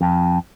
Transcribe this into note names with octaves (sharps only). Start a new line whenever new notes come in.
F2